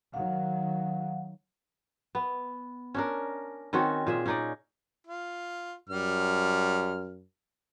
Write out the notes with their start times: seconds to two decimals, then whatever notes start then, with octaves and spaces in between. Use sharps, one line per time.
0.14 D#3 F#3 F5 F#5
2.15 B3
2.94 C#4 D4 A#4
3.73 D#3 C4 C#4 F#4
4.07 A#2 G#4 E5
4.26 C#4 D#4 D5
5.07 F4
5.89 F#2 G3 F6